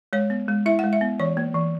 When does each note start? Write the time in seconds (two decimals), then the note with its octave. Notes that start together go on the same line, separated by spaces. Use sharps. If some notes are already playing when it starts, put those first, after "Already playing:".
0.13 G#3 C#5
0.30 B3
0.48 G#3
0.66 E4 E5
0.79 G#3 F#5
0.93 E5
1.01 B3
1.20 E3 C#5
1.37 A#3
1.54 E3